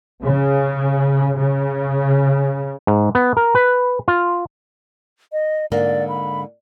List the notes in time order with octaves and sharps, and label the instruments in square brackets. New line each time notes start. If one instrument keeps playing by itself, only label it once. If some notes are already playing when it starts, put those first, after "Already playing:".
[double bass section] C#3
C#3
[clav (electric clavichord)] G#2
B3
A#4
B4
F4
[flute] D#5
[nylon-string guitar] G#2 D3 A#3 [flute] D5
[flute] B5